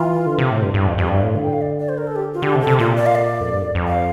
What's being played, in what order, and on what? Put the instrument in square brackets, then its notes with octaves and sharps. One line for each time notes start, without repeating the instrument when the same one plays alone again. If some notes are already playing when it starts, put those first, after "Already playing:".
Already playing: [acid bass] E3 [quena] F4
[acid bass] D3
C3
A2
G2
G2
F2
[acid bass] F2 [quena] G4
[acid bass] G2 [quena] D5
[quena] F5
[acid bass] A2
[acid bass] D3 [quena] F5
[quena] G5
F5
D5
D5
C5
A#4
A4
G4
F4
[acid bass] D3 [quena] G4
[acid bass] C3
[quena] A4
[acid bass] C3
[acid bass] A#2 [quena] F4
[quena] D5
F5
D5
[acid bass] F2
G2
F2
F2
[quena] F5